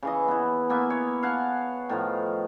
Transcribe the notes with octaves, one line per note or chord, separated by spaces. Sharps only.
C#3 E3 D#5
B3 E4
A#3 B3 E5 G#5
C#5
F5 F#5 G#5 A5
A2 D#3 F3